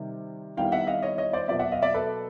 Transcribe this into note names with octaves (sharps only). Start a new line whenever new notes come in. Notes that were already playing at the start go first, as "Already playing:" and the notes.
Already playing: C3 D#3 G3
D#3 G3 B3 E4 F5 G5
E5 F#5
D#5 F5
C#5 D#5
C#5 D#5
C5 D5
B2 F#3 A#3 D5 E5
E5 F#5
D#5 F5
D5 E5
A4 B4